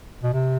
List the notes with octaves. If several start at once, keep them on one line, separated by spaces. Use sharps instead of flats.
B2
C3